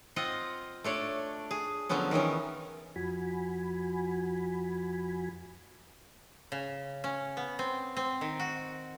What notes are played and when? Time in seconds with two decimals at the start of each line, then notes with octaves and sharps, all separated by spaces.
0.16 C4 F4 D#5 F#5
0.84 A3 D4 C#5 D5
1.51 G#4
1.89 D3 F3 F#3 B3 C#4
2.11 D#3 E3 B3 C#4
2.96 F2 F3 F#4 G#5 B5
6.52 C#3
7.04 C#4
7.37 B3
7.59 C4
7.97 C4
8.21 D#3
8.40 F#4